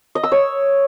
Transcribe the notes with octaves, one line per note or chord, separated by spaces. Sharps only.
D#5
E6
C#5